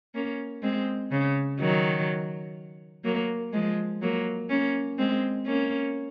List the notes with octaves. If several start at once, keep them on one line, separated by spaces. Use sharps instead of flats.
A#3 C#4
G#3 C4
C#3
D#3 F#3
F#3 A#3
F3 G#3
F#3 A#3
A#3 C#4
G#3 C4
A#3 C#4